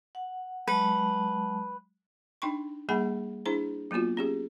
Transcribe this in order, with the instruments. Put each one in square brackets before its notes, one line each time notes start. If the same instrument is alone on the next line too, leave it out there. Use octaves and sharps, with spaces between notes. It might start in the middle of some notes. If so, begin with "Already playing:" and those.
[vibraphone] F#5
[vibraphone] F#3 G#3 A5 [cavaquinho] B4
[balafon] D4 D#4 G5 C6 C#6
G3 A#3 G#4 F#5 G#5 B5
D4 E4 G#4 C5 A#5
F#3 A#3 B3 F4 F#4
C#4 G4 G#4